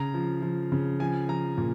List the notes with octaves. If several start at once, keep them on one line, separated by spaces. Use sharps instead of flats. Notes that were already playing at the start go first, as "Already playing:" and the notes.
Already playing: C#3 A#5
F3
F3
C#3
F3 G#5
F3 A#5
A#2